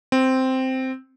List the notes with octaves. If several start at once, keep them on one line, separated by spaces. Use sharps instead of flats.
C4